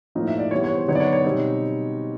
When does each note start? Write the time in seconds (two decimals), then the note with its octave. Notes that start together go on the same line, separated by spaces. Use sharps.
0.15 A2 F3 A#3 D#4
0.28 E5
0.39 D5
0.51 E3 G3 B3 C#5
0.64 C#5
0.76 C5
0.88 D3 F#3 B3 D#4 C#5
0.95 D5
1.00 C#5
1.13 C#5
1.24 B2 G3 C4 D#4